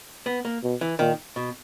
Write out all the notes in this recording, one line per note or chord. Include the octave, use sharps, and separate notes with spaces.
B3
A#3
B2
E3
A#2 D#3
B2